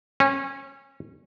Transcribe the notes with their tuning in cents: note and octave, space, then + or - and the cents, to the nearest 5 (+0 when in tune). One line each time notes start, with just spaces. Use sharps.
C#4 -25